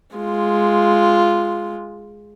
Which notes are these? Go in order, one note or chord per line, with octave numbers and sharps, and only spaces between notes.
G#3 F4